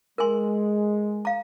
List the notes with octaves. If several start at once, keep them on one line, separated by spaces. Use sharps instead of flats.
G#3 A#4 G#5 C6
F5 A#5